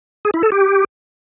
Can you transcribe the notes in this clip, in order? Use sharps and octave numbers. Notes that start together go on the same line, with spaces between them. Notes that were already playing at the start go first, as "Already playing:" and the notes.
G#4
E4
A4
G4